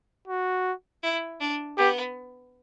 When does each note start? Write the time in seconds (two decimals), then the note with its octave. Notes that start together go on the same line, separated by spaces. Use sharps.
0.28 F#4
1.03 E4
1.40 D4
1.77 B3 G4